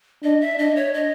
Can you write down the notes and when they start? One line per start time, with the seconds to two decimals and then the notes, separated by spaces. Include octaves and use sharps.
0.24 D4 D#5
0.41 E5
0.59 D4 D#5
0.76 C#5
0.94 D#5